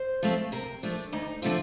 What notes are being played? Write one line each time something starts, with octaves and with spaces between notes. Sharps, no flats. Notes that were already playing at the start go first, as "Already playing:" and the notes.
Already playing: C5
F3 A3 C4
C3 A#4
F3 A3 D4
D2 D#4
D3 F3 A3 C4 F4